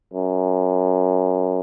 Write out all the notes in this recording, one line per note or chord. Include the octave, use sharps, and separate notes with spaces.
F#2